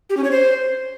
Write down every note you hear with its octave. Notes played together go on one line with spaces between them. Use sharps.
G4
C#4
C#5
C5